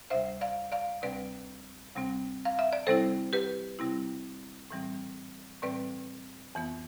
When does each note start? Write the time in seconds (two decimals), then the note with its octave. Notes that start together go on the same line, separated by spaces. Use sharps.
0.10 D2 C3 G3 C5 E5
0.41 D5 F5
0.72 D5 F5
1.02 D2 C3 G3 C4 B4 D5
1.95 D2 C3 G3 C4
2.45 F5
2.59 E5
2.73 D5
2.87 C3 G3 C4 E4 A4 C5
3.33 G4 B4
3.79 C3 G3 C4 E4
4.70 A2 E3 G3 C4
5.62 A2 E3 G3 C4 B4 D5
6.55 F2 E3 B3